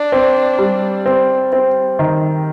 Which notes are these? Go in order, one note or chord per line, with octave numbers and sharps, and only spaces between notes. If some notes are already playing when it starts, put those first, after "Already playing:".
Already playing: D4
C4
G3
C4
C4
D#3